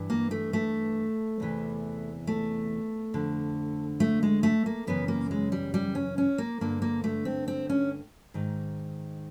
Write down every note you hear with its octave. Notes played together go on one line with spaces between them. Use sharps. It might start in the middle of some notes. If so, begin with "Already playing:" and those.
Already playing: G2 E3
A#3
A3
A3
E2 C3 E3
A3
F2 D3
A3
G#3
A3
A#3
F#2 C#3 E3 B3
A#3
G#3
G3
G3
C#4
C#4
A#3
G2 D3 A#3
A#3
A3
C4
C4
C#4
G#2 D#3